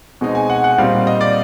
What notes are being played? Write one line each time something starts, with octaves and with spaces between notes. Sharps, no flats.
B2 G#3 C4 D#4
G#5
F#5
F#5
A#2 G3 C4 D#4 F5
D#5
D5